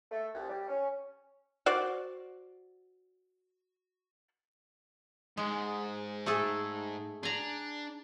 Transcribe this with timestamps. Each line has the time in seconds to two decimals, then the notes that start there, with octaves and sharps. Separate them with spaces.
0.11 A3
0.34 C2
0.49 G3
0.68 C#4
1.66 F#4 C5 D5
5.37 G#2 G#3
6.26 A3 G#4 A4
7.23 D4 G#5 A#5